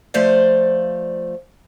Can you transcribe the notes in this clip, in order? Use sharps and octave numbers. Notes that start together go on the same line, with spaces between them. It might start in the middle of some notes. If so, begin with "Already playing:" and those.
F3 A3 C5 D5 F5